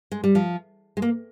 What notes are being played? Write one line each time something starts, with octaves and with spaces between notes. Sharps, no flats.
G#3
G3
F3
G#3
A#3